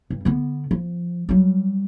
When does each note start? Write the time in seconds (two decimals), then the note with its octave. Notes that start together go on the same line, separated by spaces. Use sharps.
0.10 G2
0.25 D3 B3
0.71 F3
1.29 F#3 G3